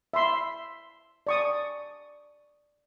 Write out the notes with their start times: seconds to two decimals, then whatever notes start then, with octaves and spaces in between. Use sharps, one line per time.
0.13 E5 B5 C6
1.27 D5 C#6 D#6